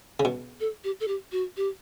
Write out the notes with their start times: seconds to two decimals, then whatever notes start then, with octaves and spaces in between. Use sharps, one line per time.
0.20 C#3
0.25 B2
0.60 A4
0.84 G4
1.00 A4
1.08 G4
1.32 F#4
1.57 G4